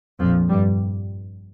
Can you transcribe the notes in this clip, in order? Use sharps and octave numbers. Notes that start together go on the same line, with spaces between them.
A#1 F2 A#2 F3
G2 G3